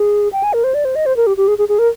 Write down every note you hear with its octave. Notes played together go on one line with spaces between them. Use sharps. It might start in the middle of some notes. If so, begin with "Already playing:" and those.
Already playing: G#4
G5
G#5
A#4
C5
D5
C5
D#5
C5
A#4
G4
G4
G#4
G#4
G#4
A#4